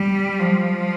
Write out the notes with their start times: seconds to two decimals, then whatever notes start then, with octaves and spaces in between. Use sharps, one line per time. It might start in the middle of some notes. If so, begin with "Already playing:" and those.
Already playing: G3
0.39 F3